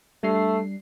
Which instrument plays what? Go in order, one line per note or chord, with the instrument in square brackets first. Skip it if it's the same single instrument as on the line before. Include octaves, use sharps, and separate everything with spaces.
[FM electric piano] G3 D4 C7 [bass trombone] A3